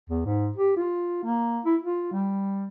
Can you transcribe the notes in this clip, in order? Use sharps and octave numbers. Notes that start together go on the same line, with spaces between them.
E2
G#2
G4
F4
A#3
E4
F4
G3